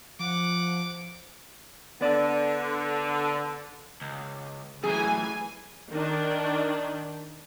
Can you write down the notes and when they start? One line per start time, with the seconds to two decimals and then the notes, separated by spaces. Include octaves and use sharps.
0.19 F3 F#5 D6
2.01 D3 B3 D5
4.01 C#2
4.83 F#2 A2 E3 G#4 G#5
5.91 D#3 D4